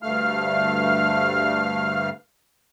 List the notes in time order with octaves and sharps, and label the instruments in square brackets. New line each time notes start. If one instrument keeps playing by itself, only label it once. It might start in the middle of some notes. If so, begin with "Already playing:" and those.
[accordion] D2 G2 A3 F5 F6